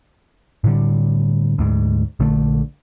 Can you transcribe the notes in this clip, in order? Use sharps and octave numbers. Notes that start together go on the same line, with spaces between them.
A2 D3 G3
D2 G#2
A#1 D3 A3